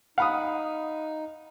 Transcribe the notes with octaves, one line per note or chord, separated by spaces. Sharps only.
D#4 F5 F#5 B5 D#6